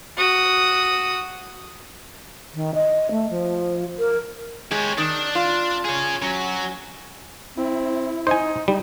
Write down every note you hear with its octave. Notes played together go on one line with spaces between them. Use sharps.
F#4 D#6
D#3
D#5
A3
F3
A#4
G#3 G4 C#5
D#3 D4
F4
G#4 C#5
F#3 C#4
C4 E4
D#4 C5 G#5
G3 D#4